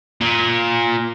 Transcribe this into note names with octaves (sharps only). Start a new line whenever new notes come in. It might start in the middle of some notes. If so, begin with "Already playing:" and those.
A#2